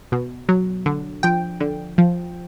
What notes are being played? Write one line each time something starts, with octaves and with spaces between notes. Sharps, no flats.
B2
F#3
D3
F3 G5
D3
F3